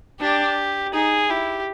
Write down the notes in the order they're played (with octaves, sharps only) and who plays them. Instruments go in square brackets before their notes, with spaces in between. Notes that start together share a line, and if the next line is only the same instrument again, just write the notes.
[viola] D4 [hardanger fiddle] G4
[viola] D#4 [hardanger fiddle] G#4
[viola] E4 [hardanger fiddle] G4